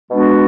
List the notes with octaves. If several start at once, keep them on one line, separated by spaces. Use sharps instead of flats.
B2 G#3 B3 D4 F#4